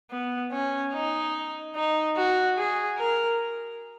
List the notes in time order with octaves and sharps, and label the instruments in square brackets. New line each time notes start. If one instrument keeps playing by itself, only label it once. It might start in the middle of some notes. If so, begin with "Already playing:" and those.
[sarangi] B3
C#4
D#4
D#4
F#4
G#4
A#4